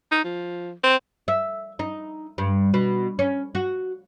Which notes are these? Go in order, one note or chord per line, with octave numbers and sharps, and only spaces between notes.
D#4
F3
C4
E5
D#4
G2
B2
C#4
F#4